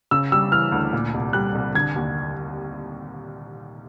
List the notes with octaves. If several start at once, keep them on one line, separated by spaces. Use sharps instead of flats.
C#3 E6
G3 E6
E3 F6
D2
A#2
C2
G3 F#6
C2
D3 G#6
D#2